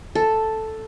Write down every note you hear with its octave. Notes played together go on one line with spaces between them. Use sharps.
A4